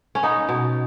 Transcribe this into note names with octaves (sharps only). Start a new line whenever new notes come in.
C#4
B3 D#4
B2